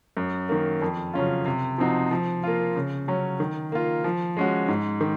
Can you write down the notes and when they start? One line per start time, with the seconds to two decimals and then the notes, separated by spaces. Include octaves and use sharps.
0.17 F#2
0.49 D#3 A#3
0.81 F2
1.14 C#3 F#3 C#4 F4
1.46 C3
1.78 F3 C4 D#4 F#4
2.11 F3
2.43 A#3 F4
2.76 C#3
3.08 F#3 C#4
3.40 D#3
3.72 A#3 F4
4.04 F3
4.37 G#3 C#4 F#4
4.68 G#2
5.01 D#3